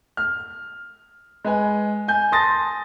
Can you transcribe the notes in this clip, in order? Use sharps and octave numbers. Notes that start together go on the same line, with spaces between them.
F6
G#3 B4 G#5
G#5 G6
A5 C6 D#6 A6 A#6